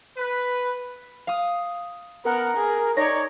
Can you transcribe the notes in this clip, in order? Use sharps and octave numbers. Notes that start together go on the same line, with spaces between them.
B4
F5 D#6
B3 A#4 F#5
G#4
D#4 C#5 D5 G#6 A#6